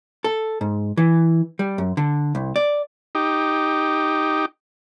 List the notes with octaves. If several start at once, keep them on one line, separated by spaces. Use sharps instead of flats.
A4
G#2
E3
G3
F#2
D3
C2
D5
D#4 G4